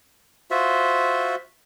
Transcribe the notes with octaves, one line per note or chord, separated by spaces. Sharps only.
F4 F#4 C5 E5